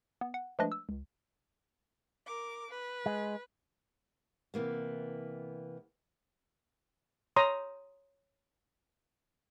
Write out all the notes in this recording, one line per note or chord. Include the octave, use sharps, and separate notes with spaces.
B3
F#5
F3 G#3 A3 D4 B4 D#5
E6
C#2
A#4 D6
B4
G#3
C3 E3 A#3 B3
C#5 A#5 C6 D#6